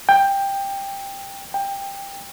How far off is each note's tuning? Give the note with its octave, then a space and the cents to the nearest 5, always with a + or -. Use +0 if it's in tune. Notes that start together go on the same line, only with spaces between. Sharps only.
G5 +10
G5 +15